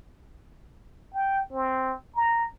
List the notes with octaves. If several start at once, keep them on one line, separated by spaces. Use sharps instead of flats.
G5
C4
A#5